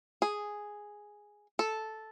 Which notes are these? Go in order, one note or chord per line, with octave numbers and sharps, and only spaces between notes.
G#4
A4